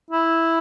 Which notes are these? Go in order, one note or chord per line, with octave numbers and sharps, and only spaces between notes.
E4